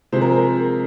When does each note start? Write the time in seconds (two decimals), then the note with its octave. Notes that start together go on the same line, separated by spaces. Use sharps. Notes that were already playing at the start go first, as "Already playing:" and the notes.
0.12 C3 F3 G#3 C5
0.21 A#4
0.30 G#4
0.38 A#4